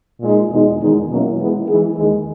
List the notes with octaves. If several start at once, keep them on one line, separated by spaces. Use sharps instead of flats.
A#2 G#3 D#4
E2 B2 G#3 D#4
E2 D#3 G#3 D#4
B2 F#3 A#3 C#4 E4
E3 G#3 B3 E4
E3 G#3 D#4 G#4
D#2 D#3 G#3